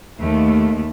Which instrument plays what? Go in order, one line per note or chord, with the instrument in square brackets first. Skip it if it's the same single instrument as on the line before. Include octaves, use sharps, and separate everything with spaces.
[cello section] D#2 A3